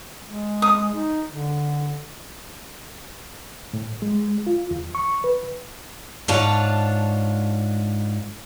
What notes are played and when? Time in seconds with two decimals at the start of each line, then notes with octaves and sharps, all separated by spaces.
0.25 G#3
0.62 D#6
0.94 D#4
1.28 D3
3.73 A2
4.02 G#3
4.47 F4
4.71 E2
4.95 C#6
5.24 B4
6.28 G#2 D4 F4 C#5 A5